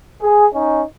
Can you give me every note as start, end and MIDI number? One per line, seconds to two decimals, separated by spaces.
0.22 0.47 68
0.54 0.84 61
0.54 0.84 63